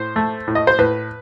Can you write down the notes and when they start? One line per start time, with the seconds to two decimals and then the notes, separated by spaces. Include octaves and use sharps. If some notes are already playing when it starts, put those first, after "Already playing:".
Already playing: A2 C5
0.16 A3
0.48 A2
0.55 D#5
0.67 C5
0.78 A2 B4